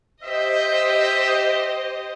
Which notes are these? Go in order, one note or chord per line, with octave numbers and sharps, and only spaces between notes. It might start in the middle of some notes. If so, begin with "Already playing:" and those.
G4 C5 D#5 E5